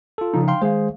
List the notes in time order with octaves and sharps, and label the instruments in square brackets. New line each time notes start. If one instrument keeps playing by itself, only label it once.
[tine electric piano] F4 A4
[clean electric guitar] C#3 F3 D#4
[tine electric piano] F5 G5 C6
[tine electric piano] D#3 G#4 C5 [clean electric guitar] G#3 F5